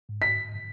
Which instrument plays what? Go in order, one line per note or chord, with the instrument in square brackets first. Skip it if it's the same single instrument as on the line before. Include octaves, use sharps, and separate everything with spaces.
[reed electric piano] G#2
[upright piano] B6